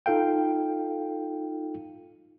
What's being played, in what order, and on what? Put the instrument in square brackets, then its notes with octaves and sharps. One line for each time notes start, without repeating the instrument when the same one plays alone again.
[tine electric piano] D#4 F4 A4 F5 G5